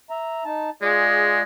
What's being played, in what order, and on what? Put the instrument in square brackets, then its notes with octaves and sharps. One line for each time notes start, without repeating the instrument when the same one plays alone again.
[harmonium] E5 A#5
D#4 A5
[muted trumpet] G#3 [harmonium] F4 G#4 D5